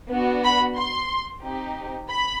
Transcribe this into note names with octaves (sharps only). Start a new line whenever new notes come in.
B3 D4 F#4
B5
C6
C4 D#4 G4
B5